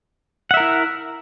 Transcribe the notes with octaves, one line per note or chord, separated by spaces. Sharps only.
E4 A#4 E5 F#5